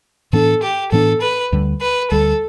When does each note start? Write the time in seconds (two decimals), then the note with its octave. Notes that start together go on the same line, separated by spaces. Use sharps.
0.33 A2 E3 B3 D4 A4
0.63 G4
0.92 A2 E3 B3 D4 A4
1.21 B4
1.52 D2 D3 G3
1.81 B4
2.11 D2 D3 G3 A4